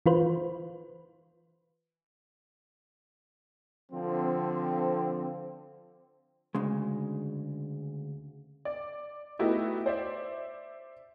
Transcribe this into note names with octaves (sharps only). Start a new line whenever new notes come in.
E3 F4 B4 C5
D3 F3 C4
D2 C#3 G#3
D5
A3 B3 D#4 E4 F#4 G4
C5 D5 E5